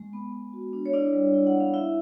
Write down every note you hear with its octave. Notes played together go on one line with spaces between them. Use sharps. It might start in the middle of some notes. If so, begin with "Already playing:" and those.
Already playing: G#3
B3
B3
F#4
D4
C#5
D4 E4 D5
G3
E4
F#5
B3
F5
E4 E5